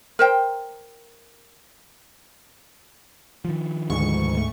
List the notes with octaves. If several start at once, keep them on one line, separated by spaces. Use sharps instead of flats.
A#4 C5 G5
D#3 F3
D2 G#2 C#6
A3